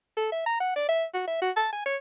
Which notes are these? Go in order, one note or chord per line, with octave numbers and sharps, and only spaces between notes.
A4
E5
A#5
F#5
D5
E5
F#4
E5
F#4
A5
G#5
C#5